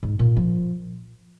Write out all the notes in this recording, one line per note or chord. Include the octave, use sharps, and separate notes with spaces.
G#2
A#2
F3